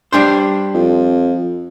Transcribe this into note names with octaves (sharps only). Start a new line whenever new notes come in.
G3 D4 C5
F2